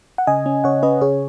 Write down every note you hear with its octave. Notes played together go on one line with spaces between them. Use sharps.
F#5
C#3 D#5 G#5
C#4
C#3 C#5 F#5
C#4 B4 D#5
C#3 G#4 C#5